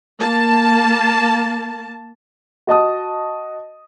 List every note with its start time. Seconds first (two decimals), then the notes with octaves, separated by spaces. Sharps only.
0.20 A#3 A5
2.67 F#4 D#5 A5 D#6